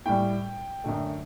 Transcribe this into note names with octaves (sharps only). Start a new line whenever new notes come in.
A2 G3 G5
F#2 D3 A3